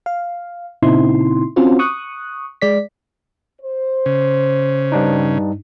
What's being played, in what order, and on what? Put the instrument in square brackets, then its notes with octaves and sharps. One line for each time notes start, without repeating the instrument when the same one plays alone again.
[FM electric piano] F5
A#2 C#3 C4 D#4 E4 C6
C4 C#4 F4 F#4 C5
C#6 D#6 F#6
G#3 D5 B6
[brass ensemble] C5
[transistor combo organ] C#3
[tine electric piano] G2 D4 D#4